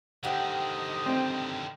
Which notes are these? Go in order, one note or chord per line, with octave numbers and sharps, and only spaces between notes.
D3 D#3 G4 C5 D#5 F#5
C4